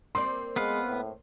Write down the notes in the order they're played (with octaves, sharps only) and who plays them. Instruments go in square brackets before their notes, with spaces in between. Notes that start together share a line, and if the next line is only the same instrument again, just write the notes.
[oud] A#3 C4 D5 [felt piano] C6
[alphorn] G#3 [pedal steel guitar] B3 B4 F5
[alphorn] A2